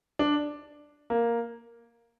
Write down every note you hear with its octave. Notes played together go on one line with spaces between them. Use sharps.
D4
A#3